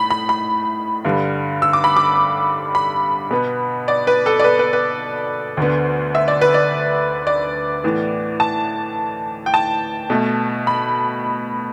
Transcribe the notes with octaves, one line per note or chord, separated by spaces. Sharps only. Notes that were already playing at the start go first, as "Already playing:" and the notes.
Already playing: A2 A3 B5
B5
B5
G2 D3 G3
E6
D6
B5
D6
B5
B2 B3
D5
B4
A4
D5
B4
B4
B4
D2 D3 B3
E5
D5
B4
D5
D5
A2 E3 B3
A5
G5
A5
B2 A3
B5